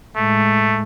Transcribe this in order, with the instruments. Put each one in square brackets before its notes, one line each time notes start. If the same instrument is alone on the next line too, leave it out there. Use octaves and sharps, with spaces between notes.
[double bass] A2 G#3 [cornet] A3